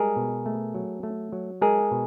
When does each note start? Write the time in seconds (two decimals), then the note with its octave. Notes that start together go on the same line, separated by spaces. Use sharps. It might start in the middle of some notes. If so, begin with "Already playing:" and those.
Already playing: G3 G#3 G#4 A#4
0.16 B2
0.46 A3
0.75 F#3
1.03 A3
1.32 F#3
1.62 G#3 G#4 A#4
1.91 B2